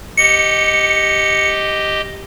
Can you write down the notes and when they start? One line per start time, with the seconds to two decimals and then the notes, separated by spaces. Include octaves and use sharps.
0.17 G4 D#5 C#7